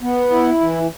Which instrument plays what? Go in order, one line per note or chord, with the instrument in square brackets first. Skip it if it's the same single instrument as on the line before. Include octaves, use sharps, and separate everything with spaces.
[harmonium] B3
E4
E3